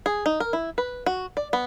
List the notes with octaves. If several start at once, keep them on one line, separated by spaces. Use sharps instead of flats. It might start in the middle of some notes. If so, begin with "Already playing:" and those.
G#4
D#4
A#4
E4
B4
F#4
D5
B3